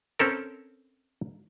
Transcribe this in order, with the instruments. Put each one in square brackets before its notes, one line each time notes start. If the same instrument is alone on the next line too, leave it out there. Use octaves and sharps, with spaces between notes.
[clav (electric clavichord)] C4 C#4 A4 A#4